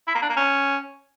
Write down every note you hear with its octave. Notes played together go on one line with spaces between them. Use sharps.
E4
A#3
D4
A#3
C#4